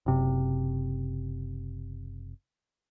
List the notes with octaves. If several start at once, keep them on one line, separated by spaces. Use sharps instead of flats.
F#1 C3